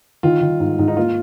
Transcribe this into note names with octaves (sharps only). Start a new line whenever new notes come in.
D#3 F4
D#3
G#2
G#2
D#4
A#3 F4